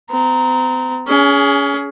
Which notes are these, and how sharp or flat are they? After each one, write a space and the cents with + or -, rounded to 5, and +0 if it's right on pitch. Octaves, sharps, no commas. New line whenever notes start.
C4 -40 A#5 +0
C#4 +30 G#4 +0